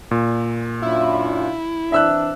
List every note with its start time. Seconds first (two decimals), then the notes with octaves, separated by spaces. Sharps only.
0.11 A#2
0.82 F#2 D4 E4 F4
1.92 E3 C4 D4 E5 E6 F#6